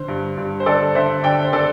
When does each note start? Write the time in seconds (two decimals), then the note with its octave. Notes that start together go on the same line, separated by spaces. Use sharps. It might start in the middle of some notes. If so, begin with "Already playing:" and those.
Already playing: D3 C5
0.08 G2
0.37 G2
0.60 C5
0.66 D3 A4 D5
0.95 D3 C5 E5
1.23 D3 D5 G5
1.44 C5
1.53 D3 A4 D5